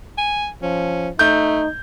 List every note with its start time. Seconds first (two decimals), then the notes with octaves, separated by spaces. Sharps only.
0.18 G#5
0.62 F3 C#4
1.19 A3 D#4 G6